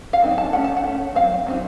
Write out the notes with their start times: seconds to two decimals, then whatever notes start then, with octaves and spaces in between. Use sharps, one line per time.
0.13 F5
0.22 F#3 C4 D#4
0.38 A5
0.53 A3 C#4 F#5
0.64 A5
0.77 F#5
0.84 A3 C#4
1.15 F#3 C4 F5
1.47 F#3 C4 D#4